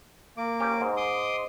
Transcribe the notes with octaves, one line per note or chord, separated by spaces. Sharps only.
A#3 D6
C#4 G4
G#2
C6 D6 D#6